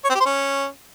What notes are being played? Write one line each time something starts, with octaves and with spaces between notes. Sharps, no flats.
C#5
C4
G4
C5
C#4